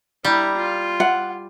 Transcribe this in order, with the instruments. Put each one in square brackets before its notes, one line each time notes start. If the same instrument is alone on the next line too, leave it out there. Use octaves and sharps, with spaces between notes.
[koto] G3 [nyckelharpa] E4 A#5
[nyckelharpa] F4
[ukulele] F#5